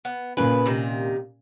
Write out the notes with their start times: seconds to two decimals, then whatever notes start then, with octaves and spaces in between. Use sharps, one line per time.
0.05 B3
0.37 A#2 C#3 C#4 B4
0.66 C3 D#3